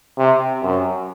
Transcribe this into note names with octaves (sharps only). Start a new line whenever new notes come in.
C3
F#2